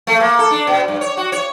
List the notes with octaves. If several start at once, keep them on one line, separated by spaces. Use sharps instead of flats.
A3
A#3
A4
D4
B2
G2
C#5
F#4
C#5